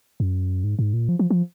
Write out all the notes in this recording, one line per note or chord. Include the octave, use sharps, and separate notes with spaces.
F#2
G#2
G#2
A#2
F3
F3
F3